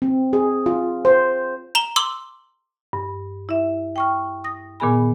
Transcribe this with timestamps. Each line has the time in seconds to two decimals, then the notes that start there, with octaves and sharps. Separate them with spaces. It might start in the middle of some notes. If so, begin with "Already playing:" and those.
0.02 C4
0.33 G#4
0.66 F4
1.05 C5
1.75 A#5 E7 G7
1.96 C6 D6 E6 F#7 G7
2.93 G2
3.49 E4 E5
3.96 G5 C#6 F6
4.44 D#6 A#6
4.80 A#2 D#3 B3 G#4 G#5 B5